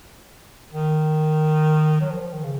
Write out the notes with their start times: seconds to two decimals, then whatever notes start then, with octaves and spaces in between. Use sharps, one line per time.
0.73 D#3
2.01 F#3
2.10 F3
2.21 F3
2.33 D#3
2.44 C#3